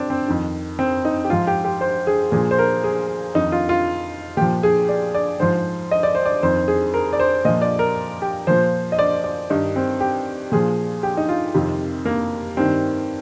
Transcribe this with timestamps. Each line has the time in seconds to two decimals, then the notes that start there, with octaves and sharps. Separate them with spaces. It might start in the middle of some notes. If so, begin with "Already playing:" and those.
Already playing: C4 D4
0.10 C4
0.28 F2 D#3
0.79 C4
1.05 D#4
1.24 G4
1.30 G#2 F3 F4
1.47 G4
1.65 G4
1.81 C5
2.07 G#4
2.32 A#2 F3 G#4
2.51 C5
2.59 A#4
2.84 G#4
3.35 F2 D#3 D#4
3.52 F4
3.69 F4
4.37 A#2 F3 G4
4.63 G#4
4.89 D5
5.15 D5
5.40 G#2 F3 C5
5.91 D#5
6.03 D5
6.15 C5
6.25 D5
6.43 F2 D#3 C5
6.68 G#4
6.94 A#4
7.13 D5
7.20 C5
7.45 A#2 F3 D#5
7.62 D5
7.79 A#4
8.22 G4
8.47 A#2 F3 C5
8.92 D#5
8.99 D5
9.24 D5
9.50 G2 D#3 D#4
9.76 C4
10.00 G4
10.52 A#2 F3 G#4
11.03 G4
11.17 D#4
11.29 F4
11.54 F2 C3 D#3
12.05 A#3
12.57 G2 D#3 C4